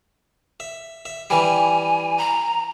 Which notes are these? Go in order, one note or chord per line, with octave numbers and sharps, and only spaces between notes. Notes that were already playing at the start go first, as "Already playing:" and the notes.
E5
E5
E3 G3 G#5
A#5